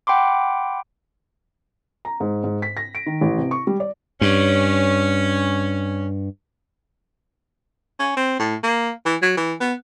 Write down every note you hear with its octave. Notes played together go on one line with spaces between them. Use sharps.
F#5 G5 B5 C6 D6
A#5
G#2
G#2
B6
A#6
D7
D#3
A1
C3
C#6
G3
D5
G2 C#4
C#4
C4
A2
A#3
E3
F#3
E3
B3